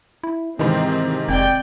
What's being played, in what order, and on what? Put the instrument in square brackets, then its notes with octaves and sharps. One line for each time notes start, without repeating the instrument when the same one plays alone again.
[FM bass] E4
[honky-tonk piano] G#2 C3 D#3 [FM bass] E3 [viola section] C4
[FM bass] F1 [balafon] C4 [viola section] D5 G5